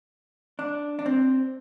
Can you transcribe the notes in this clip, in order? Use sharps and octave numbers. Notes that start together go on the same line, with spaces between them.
D4
D4
C4